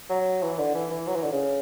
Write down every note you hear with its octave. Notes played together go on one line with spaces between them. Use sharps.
F#3
E3
D3
E3
E3
F#3
E3
D3
C#3